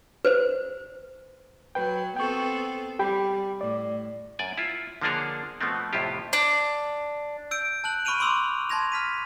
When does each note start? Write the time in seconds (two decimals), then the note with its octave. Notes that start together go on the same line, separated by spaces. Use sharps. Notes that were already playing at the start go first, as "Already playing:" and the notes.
0.25 B4 C5
1.75 F#3 B4 G5
2.16 B3 C4 A4 G5 C#6
2.99 G3 G4 G5 B5
3.61 A2 D5
4.39 F#2 D5 G#5
4.58 E4 F4
5.01 D3 F3 A#3 D4 G#4 C#5
5.61 B2 F3 A3 B3 C4
5.93 F2 A2 C3 E4 F4 G4
6.33 D4
7.51 E6 G6 D7
7.84 A5 F#6 F#7
8.05 B5 C#6 F6 D7 D#7 F7
8.20 C6 D6 E6 F7
8.69 A5 C6 G#6 A#6 F7
8.92 F6 B6 D#7